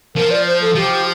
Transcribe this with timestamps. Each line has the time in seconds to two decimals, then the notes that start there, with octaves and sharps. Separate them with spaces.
0.15 F3 A#4
0.31 D5
0.46 C5
0.61 A4
0.75 F3 G4